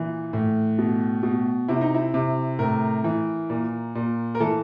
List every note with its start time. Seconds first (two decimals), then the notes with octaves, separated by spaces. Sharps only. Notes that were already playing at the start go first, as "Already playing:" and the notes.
Already playing: A#2 E3
0.33 A2
0.78 B2
1.23 B2
1.68 C3 E4
1.81 D#4
1.95 E4
2.14 C3
2.59 A2 A#4
3.04 E3
3.50 A#2
3.95 A#2
4.35 A#4
4.40 E3 A4